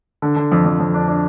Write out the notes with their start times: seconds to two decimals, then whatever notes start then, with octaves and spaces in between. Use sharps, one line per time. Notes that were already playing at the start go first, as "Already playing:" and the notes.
0.22 D3
0.36 D3
0.52 F2
0.65 F2
0.80 F2
0.94 D4
1.08 D4